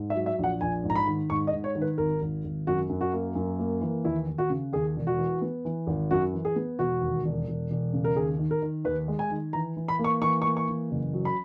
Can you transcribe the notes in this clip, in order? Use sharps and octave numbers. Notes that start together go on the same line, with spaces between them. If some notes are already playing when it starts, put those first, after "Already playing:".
Already playing: G#2
E5
F#3
E5
A#1 F#5
A#1 G#5
G#2
A#5
B5
D#3
G#2 C#6
D#5
G#2
C#5
D#3
B4
G#1 A#4
G#1
G#1
F#2 F#4
F#2
F#4
A#3
F#2
A#3
E3
D#2 E4
D#2
F#4
C#3
D#2 G#4
E1
F#4
E3
B3
E3
G#1
F#2 F#4
E3
G#4
B3
E1 F#4
D#2
E1
E1
E1
C#3
A#4
D#2 G#4
D#3
A#4
D#3
D#2 B4
G#3
G#5
D#3
E3 A#5
E3
B5
A#3
C#6
E3 C#6
C#6
A#3
C#6
E3
F#1
F#3
B5